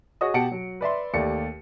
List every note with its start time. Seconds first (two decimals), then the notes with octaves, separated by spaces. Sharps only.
0.21 F#4 G#4 C#5 D#5 D#6
0.34 B2 G4 F#5 A5 C#7 D7
0.52 F#3
0.81 B4 D5 E5 C6
1.14 D#2 A3 G4 D5 C#7